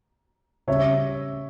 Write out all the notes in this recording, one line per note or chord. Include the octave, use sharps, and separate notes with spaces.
C#3 G3 C#4 C#5 E5